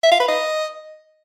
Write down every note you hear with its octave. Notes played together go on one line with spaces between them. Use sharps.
E5
F5
B4
D#5